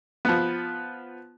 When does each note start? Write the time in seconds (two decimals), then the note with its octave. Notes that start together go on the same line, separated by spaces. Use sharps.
0.25 F3 B3